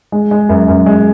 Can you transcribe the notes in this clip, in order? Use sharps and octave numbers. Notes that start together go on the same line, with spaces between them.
G#3
G#3
F#2
F#2
G#3